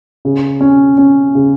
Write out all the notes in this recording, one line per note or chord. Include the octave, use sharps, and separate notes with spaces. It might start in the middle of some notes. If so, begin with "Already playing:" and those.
C#3
C#4
C#4
C#3